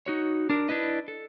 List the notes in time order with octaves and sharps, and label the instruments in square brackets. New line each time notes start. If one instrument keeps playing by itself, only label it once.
[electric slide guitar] D#4 F#4 C#5
D4 A#4
D4 E4 B4 D#5
A4